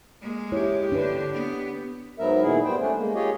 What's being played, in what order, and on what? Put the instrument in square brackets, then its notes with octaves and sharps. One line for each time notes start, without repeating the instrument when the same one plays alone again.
[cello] G#3 A#3
[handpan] E4 C#5 [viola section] G4
[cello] D3 [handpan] D4 B4
[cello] B3
[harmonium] G#2 F#3 B3 A#4 E5
A#2 D#3 B3 E4 G#4
G3 B3 C5 G5
A3 C#4 D4
G#3 A#3
F4 G4 G#4 C#5 D#5